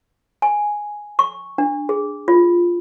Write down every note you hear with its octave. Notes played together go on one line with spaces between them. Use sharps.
G#5
C#6
D4
G#4
F4